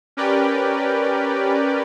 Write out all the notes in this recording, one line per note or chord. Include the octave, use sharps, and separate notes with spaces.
C#4 G4 A#4 B4 D5 G5